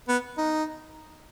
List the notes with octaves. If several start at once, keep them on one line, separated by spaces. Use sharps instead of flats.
B3
D#4